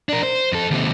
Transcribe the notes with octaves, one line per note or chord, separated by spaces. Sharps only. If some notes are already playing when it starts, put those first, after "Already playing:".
D4 A#4
C5
F2 A4
D#2 C3